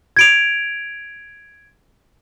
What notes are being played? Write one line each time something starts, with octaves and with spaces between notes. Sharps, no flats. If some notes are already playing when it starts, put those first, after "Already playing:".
G#6 D7 F7